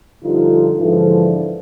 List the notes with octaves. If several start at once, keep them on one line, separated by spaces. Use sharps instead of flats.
G2 D3 F3 D#4 F4
G#2 D3 E3 F3